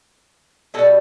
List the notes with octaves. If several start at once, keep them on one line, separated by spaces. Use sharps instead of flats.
B2 G3 F#4 A4